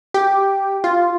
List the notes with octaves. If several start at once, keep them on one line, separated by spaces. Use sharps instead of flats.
G4
F4